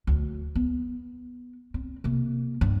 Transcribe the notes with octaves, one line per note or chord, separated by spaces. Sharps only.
D2
B3
C4
C3 A#3
G2